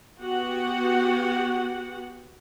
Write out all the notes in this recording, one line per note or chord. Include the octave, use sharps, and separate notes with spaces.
B3 F#4 G4 F#5